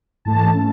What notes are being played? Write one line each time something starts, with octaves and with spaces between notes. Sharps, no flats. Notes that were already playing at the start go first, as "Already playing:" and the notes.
G#2 E3 A3 A5
A3 C#4